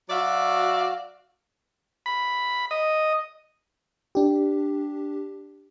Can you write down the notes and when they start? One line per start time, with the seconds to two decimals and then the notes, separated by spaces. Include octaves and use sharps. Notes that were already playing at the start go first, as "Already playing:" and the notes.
0.10 F#3 F#4 D5 E5 F5
2.06 B5
2.71 D#5
4.15 D4 G4